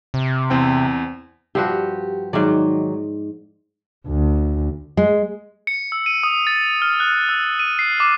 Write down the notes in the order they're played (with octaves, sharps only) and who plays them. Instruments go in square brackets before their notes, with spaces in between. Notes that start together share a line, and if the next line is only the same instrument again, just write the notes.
[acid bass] C3
[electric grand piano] E2 C4 G5
[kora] G2 F3 F#4 [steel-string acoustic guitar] G4
[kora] G#2 D5 [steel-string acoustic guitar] D#3 F#3
[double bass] D2
[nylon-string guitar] G#3
[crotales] C#7
E6
D#7
D#6
A6
F6
F#6
E6
D#7
C7
D6